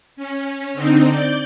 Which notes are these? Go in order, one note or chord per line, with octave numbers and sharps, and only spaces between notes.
C#4
D3 C4 D#4
D5 G6